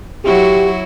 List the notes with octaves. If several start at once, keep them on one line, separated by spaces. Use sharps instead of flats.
F#3 E4 F#4 G4